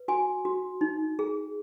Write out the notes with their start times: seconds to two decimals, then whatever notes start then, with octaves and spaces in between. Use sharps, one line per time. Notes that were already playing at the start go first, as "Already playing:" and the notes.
Already playing: B4
0.08 F#4 G#5
0.45 F#4
0.81 D#4
1.19 G#4